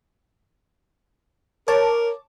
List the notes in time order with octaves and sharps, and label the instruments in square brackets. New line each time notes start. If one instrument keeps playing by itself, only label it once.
[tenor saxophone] A#4 [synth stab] C#5 A5 D6